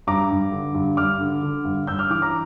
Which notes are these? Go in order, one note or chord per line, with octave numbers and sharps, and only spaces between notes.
G2 A#5 D6
G2
D3
G2
G2 D6 F6
D3
D3
G2
G2 E6 G6
D6 F6
E3 D6 F6
A#5 D6